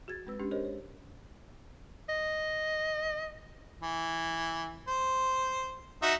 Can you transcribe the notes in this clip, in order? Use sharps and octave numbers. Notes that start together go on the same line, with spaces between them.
F#4 G#4 G#6 A6
G#3 C4 B4 E6
G#3 C#4 D4 G4
G4 G#4 A#4 C5 C#5 D#5
C#5
D#5
E3
C5
D#4 F#4 E5